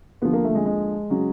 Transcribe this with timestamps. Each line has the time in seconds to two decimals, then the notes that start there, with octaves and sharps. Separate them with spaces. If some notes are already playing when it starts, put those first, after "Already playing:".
0.22 D#2 D3 F3 B3
0.33 A#3
0.44 A3
0.55 G#3
0.66 G#3
1.10 C#3 F#3